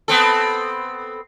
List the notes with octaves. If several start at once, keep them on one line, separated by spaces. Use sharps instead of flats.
B3 C4 A4